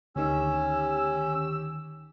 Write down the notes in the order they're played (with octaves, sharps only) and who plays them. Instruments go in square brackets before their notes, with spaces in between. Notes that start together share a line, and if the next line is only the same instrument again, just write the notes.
[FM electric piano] D2 D#3 [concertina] C#4 [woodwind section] G4 E6